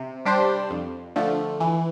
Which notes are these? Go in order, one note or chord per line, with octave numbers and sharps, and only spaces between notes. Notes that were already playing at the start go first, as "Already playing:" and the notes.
Already playing: C3
G3 D4 G4 C5
F2
D3 F3 A3
E3